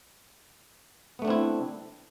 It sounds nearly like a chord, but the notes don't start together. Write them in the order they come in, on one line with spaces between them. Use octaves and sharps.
B3 A3 D4 C4 E4